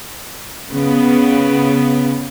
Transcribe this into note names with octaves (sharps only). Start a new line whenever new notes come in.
C#3 B3